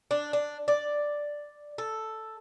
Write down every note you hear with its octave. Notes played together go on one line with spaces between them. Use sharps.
D4
D4
D5
A4